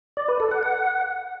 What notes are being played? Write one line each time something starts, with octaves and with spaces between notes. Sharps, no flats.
D5
B4
A4
F#5
F#5